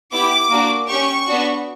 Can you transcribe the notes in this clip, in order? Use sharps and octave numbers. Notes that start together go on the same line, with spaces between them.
B3 E4 G4 D6
A#3 D4 F#4
C#4 G4 C#6
B3 D4 F#4